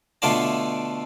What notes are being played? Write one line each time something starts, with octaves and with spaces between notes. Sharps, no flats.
B2 D3 A3 F4 D5 A5